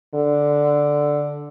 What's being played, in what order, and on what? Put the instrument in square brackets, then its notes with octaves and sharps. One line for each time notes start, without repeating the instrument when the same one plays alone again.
[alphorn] D3